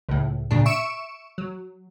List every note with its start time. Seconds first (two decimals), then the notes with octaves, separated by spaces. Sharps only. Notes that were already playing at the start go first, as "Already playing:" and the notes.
0.09 C#2 A2
0.51 A#2 C#3 D4
0.66 E5 C#6 C#7 D7 E7
1.38 F#3